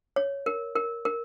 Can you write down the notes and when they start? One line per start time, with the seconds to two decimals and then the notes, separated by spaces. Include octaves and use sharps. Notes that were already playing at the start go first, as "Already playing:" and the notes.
0.16 C#5
0.46 A#4
0.76 A#4
1.05 A#4